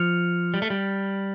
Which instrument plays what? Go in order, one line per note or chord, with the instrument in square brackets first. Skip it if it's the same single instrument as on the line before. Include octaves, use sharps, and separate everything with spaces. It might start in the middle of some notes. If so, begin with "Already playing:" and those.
Already playing: [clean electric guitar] F3 [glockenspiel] F6 C#7 F7
[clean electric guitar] G3
A3
G3